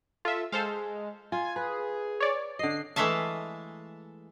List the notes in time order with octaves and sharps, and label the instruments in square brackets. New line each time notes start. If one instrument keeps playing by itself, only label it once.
[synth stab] F4 E5 [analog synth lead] A4
[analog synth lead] G#3 [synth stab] A4 C5 F5
[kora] F4 [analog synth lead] G#5
[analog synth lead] G#4 [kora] B4
[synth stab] C#5 D5
[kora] D3 D#5 [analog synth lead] C7
[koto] E3 G#3 A3 E5 F5 A5